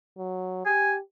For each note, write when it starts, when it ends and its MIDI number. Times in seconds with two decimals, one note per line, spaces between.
0.18 0.64 54
0.66 1.00 67
0.66 0.94 80